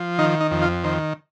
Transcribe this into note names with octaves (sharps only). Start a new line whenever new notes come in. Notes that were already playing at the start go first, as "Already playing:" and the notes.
Already playing: F3
D#3 D#4
D#4
F2
F4
D#3 C5